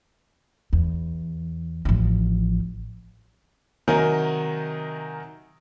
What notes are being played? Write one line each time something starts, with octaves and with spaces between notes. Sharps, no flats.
E2
A1 F3
C3 D#3 F#3 D#4 A#4 G#5